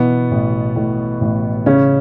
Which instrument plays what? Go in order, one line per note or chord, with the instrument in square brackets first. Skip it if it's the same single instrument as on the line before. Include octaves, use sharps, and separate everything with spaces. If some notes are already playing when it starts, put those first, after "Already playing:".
Already playing: [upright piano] B2 E3 B3
A1
A2
A1
C#3 C#4